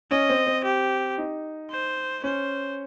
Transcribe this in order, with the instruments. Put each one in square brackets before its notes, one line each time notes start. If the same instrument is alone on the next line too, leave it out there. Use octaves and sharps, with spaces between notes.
[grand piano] C#4 [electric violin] D#5
[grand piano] C4
C4
[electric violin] G4
[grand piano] D#4
[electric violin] C5
[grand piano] C#4 [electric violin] C5